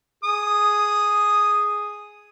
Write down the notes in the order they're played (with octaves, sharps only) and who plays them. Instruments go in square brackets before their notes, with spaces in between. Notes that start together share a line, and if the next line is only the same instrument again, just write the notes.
[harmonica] G#4 D#6